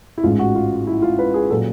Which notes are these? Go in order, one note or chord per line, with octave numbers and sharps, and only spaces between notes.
E4
A1 G#2 E3 G#3 F4
F#4
F4
E4
F4
B4
G#4
A#2 F#3 A4